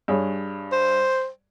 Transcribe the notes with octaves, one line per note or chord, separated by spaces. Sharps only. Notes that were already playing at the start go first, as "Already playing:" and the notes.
G2 G#4 C#5
C5